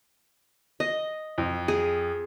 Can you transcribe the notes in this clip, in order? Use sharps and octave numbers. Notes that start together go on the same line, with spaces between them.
D#5
F2
G#4